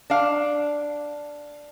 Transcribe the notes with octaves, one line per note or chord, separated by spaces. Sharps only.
D4 F5